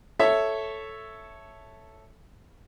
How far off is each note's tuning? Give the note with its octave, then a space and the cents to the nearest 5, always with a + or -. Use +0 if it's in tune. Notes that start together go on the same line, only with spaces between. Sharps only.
A4 +0 C#5 +0 E5 +0